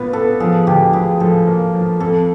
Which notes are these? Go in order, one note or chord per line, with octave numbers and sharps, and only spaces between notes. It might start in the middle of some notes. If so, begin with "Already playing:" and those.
Already playing: A#2 B3 B4
B3 A4
F3 G#4
D2 G4
F3 G#4
F3 A4
A#3
F3
F2 A4